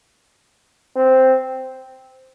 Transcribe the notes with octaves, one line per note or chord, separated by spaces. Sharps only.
C4